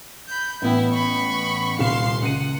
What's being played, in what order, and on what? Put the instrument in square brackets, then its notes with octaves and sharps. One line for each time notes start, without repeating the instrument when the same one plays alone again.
[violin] B5 G6
[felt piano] A1 B3 G5 [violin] E4
[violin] B5 C#6
[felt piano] D#1 C2 E7 [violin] F5 C6
[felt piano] C#2 D#7 [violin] F#5